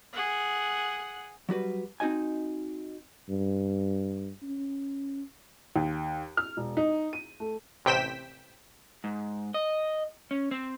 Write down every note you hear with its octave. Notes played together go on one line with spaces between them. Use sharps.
G#4 F#5
F#3 G3 F#4 B4
C4 D#4 F#4 D#5 G#5
G2
C#4
D#2
F6
E1
D#4
D#7
A3
A1 C3 G5 B6 E7
G#2
D#5
C#4
C4